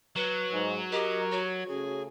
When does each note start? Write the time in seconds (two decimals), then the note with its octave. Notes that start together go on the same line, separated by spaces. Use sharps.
0.16 F#3 B4
0.52 G#2
0.92 G4 A#4 D#5
1.31 F#4 C#5
1.68 C#3 A3 C#4 G#4